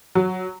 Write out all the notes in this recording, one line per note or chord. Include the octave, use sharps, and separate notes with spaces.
F#3